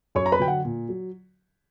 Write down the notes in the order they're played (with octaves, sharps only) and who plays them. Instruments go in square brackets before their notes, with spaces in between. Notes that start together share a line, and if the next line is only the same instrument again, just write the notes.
[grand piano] F#2 C#5 C#6
A#5
B4 B5
D3 F#3 G5
F#5
A#2
F#3